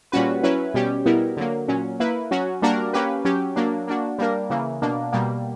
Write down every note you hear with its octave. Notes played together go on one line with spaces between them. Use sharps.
A#2 G3 C#4 F#4 B4
F#3 C#4 E4 B4
B2 G3 C#4 G4
B2 G3 B3 E4 A#4
D3 F#3 A#3
A#2 F#3 C#4
A#3 E4 B4
F#3 C#4 F#4
G3 A#3 D4 F#4 A#4
A#3 C#4 G4 B4
F#3 C#4 G4
F#3 A#3 D4
A#3 D4 F#4
G3 A#3 D4 A#4
C#3 E3 A#3
B2 A#3 D4
B2 G3 A#3